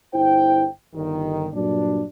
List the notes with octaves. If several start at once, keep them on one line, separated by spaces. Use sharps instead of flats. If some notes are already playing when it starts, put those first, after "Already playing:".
G1 E4 C5 G5
G1 D#3
G2 A#2 F#3 D4